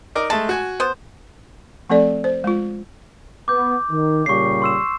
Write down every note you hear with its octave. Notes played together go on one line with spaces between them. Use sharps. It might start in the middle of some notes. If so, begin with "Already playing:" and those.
D#4 A#4 D5
G#3 A3 A5
F#4 G#5
B3 C5
F3 A3 C4 A4 D5
C5
G#3 F4
B3 D6 G6
D#3
A#2 C#3 G3 C#6 C7
C6 E6 E7